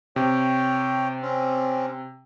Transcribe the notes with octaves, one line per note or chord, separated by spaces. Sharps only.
C3 C#5 G5
C4 C#4